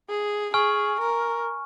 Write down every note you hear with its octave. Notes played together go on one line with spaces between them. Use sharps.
G#4
G#4 G#5 C#6 F6
A#4